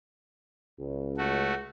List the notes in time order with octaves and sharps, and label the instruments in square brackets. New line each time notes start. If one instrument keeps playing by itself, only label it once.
[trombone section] C#2
[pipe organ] A3 F#4